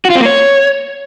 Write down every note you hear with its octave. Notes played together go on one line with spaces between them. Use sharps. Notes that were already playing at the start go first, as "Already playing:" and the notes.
F#4
F4
C4
A#3
C#5